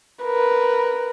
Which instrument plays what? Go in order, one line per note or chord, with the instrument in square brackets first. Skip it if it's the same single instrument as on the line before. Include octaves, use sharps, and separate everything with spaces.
[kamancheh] A#4 B4